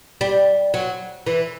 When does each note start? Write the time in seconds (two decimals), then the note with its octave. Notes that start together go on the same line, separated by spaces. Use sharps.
0.21 G3
0.74 F#3
1.27 E3